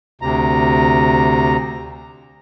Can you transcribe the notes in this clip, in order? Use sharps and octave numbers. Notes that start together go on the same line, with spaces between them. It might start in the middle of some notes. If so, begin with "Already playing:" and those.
D2 C3 A#5